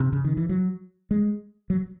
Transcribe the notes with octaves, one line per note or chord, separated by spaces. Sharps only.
C3
C#3
D#3
E3
F#3
G#3
F#3